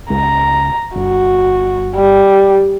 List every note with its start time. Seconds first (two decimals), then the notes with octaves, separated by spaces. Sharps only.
0.10 C#2 A#5
0.96 G1 F#4
1.95 G3